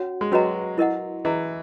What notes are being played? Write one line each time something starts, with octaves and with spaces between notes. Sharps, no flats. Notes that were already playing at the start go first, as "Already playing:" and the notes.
Already playing: C#4 F#4 C#5 F#5
G#3
F#3 C#4 F#4 B4 D#5 A#5
E4 A#4 D#5 F#5
E3 G#4 D#5 A#5